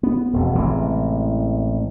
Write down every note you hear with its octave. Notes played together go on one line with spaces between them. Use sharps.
B3
E1 F2
A1 C3 E3 G#3